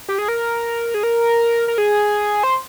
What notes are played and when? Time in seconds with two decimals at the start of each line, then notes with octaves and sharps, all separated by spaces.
0.09 G4
0.18 G#4
0.28 A#4
0.94 G#4
1.03 A#4
1.68 A#4
1.78 G#4
2.43 C5